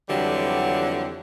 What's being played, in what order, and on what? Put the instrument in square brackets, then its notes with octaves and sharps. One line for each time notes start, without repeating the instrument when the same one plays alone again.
[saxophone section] F2 D3 E3 F#3 G3